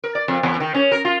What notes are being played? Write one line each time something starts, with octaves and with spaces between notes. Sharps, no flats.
A#4
D5
F2
E2
D#3
C#4
A#4
F4